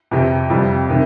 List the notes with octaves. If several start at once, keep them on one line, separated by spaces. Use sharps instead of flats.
F2 C3 F3 C4 G4
F2 C3 G3 C4 F4
C3 D#3